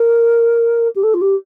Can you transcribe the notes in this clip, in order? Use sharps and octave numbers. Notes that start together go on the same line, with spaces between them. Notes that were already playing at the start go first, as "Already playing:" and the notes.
Already playing: A#4
G4
A4
F4
G4